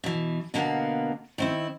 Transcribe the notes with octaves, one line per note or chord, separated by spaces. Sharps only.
B2 E3
B2 D3 A#3 B3 F5 F#5
D#3 C4 E4